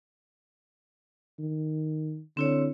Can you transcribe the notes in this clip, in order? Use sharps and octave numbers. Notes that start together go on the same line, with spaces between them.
D#3
D3 C4 E4 C#5